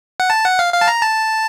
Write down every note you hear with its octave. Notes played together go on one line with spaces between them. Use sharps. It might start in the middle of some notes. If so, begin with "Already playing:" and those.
F#5
A5
F#5
F5
F5
A5
A#5
A5